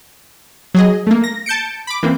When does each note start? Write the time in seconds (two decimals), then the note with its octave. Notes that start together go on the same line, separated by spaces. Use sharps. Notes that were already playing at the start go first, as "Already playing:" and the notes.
0.75 F#3 G#4 D#5
1.07 A3 A#3
1.24 A#6
1.46 A5 G6 C#7 D7
1.87 B5 D6
2.03 E3 A#3 C4